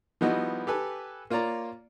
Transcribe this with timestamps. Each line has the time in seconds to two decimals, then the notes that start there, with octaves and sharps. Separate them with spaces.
0.21 F3 G3 B3 D#4 E4 F#4
0.67 G4 A4 B4 G#5
1.30 A#3 F4 C#5 D5 A#5